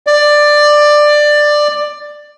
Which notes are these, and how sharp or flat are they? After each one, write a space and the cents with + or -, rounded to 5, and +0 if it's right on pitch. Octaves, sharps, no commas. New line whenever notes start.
D5 +15